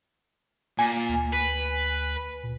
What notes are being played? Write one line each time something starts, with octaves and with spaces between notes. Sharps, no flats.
A#2 G#5
D2
B4
A#2